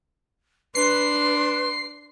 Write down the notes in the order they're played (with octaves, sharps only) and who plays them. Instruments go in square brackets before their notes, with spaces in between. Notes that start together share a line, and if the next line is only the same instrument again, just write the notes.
[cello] D4 [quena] B4 [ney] C6 [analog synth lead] C7